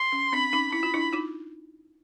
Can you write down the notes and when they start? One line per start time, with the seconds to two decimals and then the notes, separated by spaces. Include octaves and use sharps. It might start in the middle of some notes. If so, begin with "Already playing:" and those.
Already playing: C6
0.12 C#4
0.33 C4 D4 B5
0.53 C#4 D#4
0.72 E4 B5
0.83 F4
0.94 D4 E4
1.13 D#4 F4